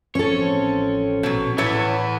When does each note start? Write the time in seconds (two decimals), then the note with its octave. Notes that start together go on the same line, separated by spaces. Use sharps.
0.15 A1 F3 C4 C#4 A4 C#5
1.23 A#1 B2 F#3
1.58 A2 E3 B3 E4 A4 C#5